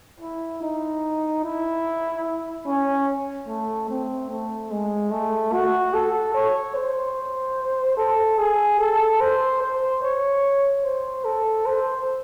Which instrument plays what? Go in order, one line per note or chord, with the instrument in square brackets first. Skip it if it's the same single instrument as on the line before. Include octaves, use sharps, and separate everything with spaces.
[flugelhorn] E4
D#4
E4
C#4
A3
C4
A3
G#3
A3
F#4
A4
C#5
C5
A4
G#4
A4
C5
C5
C#5
C5
A4
C5